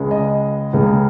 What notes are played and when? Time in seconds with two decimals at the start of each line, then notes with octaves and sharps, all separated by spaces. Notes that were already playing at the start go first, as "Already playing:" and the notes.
Already playing: C#2 C#3 G#3
0.11 D#5
0.73 C#2 C#3 G#3